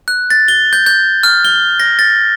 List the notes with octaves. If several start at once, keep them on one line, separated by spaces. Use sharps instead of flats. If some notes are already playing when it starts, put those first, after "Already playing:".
F#6
A6
G7
G6
G6
F6
G7
A#6
A6